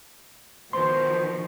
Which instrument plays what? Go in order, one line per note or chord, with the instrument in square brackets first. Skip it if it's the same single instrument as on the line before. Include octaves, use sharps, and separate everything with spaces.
[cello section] B2 D#3 F3 [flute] C5 [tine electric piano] C6